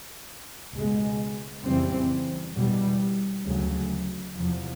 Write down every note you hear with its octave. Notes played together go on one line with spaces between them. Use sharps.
C#2 B2 G#3
F2 C#3 E3 G3 C4
E2 B2 G3
D2 C#3 F#3
E2 C3 F3